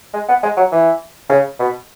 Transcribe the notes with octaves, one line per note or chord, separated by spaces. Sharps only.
G#3
B3
G#3
F#3
E3
C#3
B2